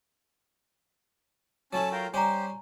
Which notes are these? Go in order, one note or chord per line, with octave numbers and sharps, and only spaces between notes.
F#3 A3 C#4 E4 A5
F4 A#4 G5
G3 C#4 G4 C5 G#5 A#5